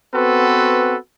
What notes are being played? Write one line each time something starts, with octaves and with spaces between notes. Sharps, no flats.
B3 C4 F#4 A4 B4